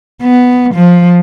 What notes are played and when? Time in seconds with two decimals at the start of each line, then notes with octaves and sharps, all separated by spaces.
0.22 B3
0.75 F3